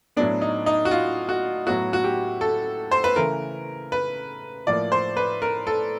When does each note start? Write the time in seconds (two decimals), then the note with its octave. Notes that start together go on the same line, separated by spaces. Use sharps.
0.17 A2 F#3 B3 D4
0.42 D#4
0.66 D#4
0.85 F#4
0.91 F4
1.29 F#4
1.66 A2 F#3 B3 F#4
1.93 F#4
2.04 G4
2.41 A4
2.91 C5
3.04 B4
3.16 C#3 E3 A3 A#4
3.92 B4
4.67 A2 F3 A#3 D5
4.92 C5
5.17 B4
5.42 A#4
5.67 A4